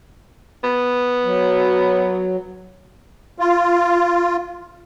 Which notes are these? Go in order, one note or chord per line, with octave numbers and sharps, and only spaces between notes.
B3
F#3
F4